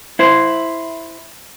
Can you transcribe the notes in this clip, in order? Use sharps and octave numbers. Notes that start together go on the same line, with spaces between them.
E4 C5